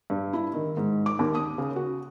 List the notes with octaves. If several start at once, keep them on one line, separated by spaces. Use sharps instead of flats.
G2
E4
D#3
G#2
D6
D#2
D#6
C#3
F#4